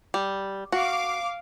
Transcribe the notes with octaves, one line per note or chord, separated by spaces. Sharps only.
G3
F#4 F5 D6